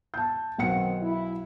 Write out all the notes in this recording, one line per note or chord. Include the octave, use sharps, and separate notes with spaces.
A5 G6
B1 D#3 C4 F#5 C#7
E4